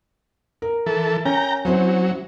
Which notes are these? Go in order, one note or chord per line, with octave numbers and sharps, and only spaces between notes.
A#4
E3 A4
C#4 G5 A#5
F#3 C4 E4 C5